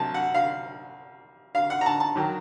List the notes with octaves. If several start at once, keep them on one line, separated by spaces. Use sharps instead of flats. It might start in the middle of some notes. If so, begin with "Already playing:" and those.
Already playing: C2 C3 F#3 A5
F#5
F5
F5
F#5
A#5
A5
A5
D#3 F#3